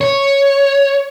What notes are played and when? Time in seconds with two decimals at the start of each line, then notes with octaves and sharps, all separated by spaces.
0.01 C#5